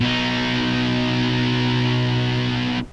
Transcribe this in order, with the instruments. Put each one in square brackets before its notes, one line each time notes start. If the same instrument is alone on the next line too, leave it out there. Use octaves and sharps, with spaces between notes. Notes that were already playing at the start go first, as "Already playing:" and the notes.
[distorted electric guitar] B2 D#4